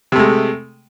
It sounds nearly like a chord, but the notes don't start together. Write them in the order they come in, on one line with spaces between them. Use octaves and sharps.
C3 A3 G#3